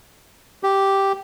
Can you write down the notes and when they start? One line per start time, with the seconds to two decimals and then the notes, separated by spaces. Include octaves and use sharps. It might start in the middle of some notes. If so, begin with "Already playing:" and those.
0.63 G4